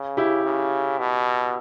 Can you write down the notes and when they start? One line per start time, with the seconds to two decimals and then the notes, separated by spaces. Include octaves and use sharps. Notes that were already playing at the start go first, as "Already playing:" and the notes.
Already playing: C#3
0.17 E4 G4
0.44 C#3
0.99 B2